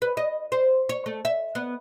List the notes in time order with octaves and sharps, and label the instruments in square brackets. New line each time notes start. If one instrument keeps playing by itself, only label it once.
[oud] B4
D#5
C5
C#5
A3
E5
B3